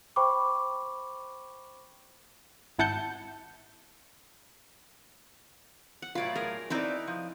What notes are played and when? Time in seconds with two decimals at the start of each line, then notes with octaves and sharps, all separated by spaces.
0.16 C5 G5 B5 C#6 D6
2.79 G#1 E4 F#5 A5 G6 C#7
6.02 F#5
6.15 A2 F#3 F4 B4 D5
6.35 G#4 A#4
6.70 C4 D#4 E4 B4 D5
7.07 F3